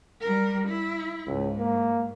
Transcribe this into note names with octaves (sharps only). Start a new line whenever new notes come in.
G3 A#4
E4
C#2 G#2
A#3